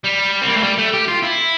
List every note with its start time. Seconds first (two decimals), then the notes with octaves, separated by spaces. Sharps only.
0.04 G3
0.42 C4
0.49 A#3
0.57 A3
0.63 G3
0.78 A3
0.93 G4
1.07 F4
1.22 E4